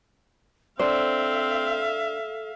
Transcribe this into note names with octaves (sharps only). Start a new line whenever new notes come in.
C4 D4 A4 C5 E5 F5